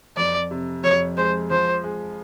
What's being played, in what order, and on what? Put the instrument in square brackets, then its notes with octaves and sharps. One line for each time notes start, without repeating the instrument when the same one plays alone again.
[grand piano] F2 [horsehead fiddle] D5
[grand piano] C3
[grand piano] F2 [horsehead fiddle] C#5
[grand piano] G#3 [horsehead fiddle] C5
[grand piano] F3 [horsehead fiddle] C5
[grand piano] G#3